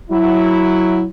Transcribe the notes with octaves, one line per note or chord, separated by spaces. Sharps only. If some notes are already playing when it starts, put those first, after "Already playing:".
F#3 E4